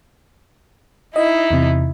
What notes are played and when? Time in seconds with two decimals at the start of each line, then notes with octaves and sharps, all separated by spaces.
1.16 D#4 E4 D#5
1.51 E2 C3